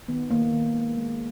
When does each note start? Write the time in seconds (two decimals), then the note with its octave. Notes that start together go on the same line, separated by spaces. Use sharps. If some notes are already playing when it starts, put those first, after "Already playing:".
0.08 D#3 B3
0.31 D#3 A#3
0.53 D#3
0.75 G#3
0.98 G#3